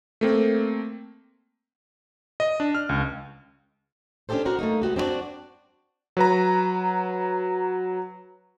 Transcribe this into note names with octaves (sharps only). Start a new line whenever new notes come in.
A3 A#3 C4
D#5
D4
F6
C#2
C#4 D4 F#4 G4 A4 C5
F#4 A#4 C5
A3 A#3 D#4
G#3 B3 F#4 G4
C4 D4 E4 F#4 D5
F#3 B4 A#5